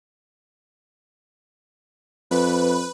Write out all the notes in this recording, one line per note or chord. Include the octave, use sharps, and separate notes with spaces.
F2 B4